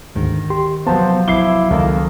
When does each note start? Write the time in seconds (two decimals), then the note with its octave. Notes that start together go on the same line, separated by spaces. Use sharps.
0.15 D2 G#2 D3 D#3
0.50 G4 C6
0.87 C3 F3 F#3 B3 C5 A5
1.28 E4 D6 C7 G7
1.70 C#2 D#3 A#3 A4